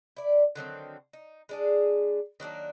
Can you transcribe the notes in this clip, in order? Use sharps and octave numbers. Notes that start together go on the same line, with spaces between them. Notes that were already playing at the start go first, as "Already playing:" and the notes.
E4 D5
D3 D#3 F#3 C4
D#4
G#3 D4 G#4
D#3 F#3 A#3 D4